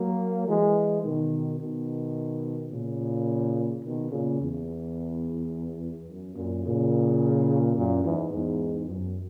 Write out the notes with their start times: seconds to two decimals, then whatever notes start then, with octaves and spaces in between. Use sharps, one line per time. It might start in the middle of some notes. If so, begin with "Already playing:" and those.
Already playing: F#3 A#3
0.47 E3 G#3
1.03 B2 D#3
1.59 B2 D#3
2.71 A#2 C#3
3.83 B2 D#3
4.11 A#2 C#3
4.39 E2
6.08 F#2
6.35 F#2 A#2
6.64 A#2 C#3
7.76 F#2 A#2
8.03 E2 G#2
8.31 E2 G#2
8.88 F#2